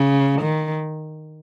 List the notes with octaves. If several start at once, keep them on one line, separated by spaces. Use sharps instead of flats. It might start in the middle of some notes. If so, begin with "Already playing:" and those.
Already playing: C#3
D#3